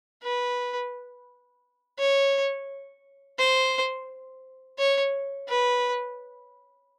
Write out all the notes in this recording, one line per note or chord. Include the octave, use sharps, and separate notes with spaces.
B4
C#5
C5
C#5
B4